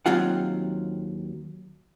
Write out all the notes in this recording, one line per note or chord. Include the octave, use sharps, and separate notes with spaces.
D#2 F#3 C4 F4 F#5